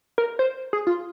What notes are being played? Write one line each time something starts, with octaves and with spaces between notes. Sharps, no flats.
A#4
C5
G#4
F4